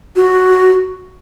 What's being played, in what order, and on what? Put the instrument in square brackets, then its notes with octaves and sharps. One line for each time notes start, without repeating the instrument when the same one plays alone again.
[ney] F#4